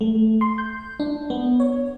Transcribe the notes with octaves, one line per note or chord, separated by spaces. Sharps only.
A3
C6
G6
D4
B3
C#5